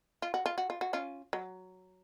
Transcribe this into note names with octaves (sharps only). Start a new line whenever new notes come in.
F4
F#4
F4
F#4
F4
F#4
C#4 F4
F#3